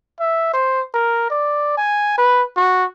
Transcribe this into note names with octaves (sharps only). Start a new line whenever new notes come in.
E5
C5
A#4
D5
G#5
B4
F#4